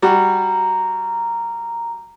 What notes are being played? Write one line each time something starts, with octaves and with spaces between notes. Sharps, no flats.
G3 F#4 A#5